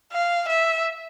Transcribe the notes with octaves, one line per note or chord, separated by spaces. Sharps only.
F5
E5